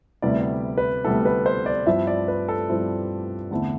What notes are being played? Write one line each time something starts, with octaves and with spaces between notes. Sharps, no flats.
D2 C3 G3 B3 E4 D5
B4
D2 C3 G3 B3 E4 A4
B4
C5
D5
G2 F3 C4 E4 E5
D5
B4
A4
G2 F3 C4 E4
E2 D3 A3 C4 E4